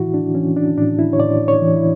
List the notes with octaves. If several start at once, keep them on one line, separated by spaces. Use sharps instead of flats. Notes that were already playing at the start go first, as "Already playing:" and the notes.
Already playing: A2 E3 E4 F#4
D4
E3 C#4
D4
A2 D4
E4
C#5
A2 D5
C#5
E3
E4